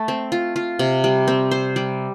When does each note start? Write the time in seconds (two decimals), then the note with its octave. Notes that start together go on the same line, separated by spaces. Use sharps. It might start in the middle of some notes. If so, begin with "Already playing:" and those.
Already playing: A3 A4
0.08 C4
0.32 F4
0.56 F4
0.79 C3
1.04 G3
1.28 C4
1.51 C5
1.76 G3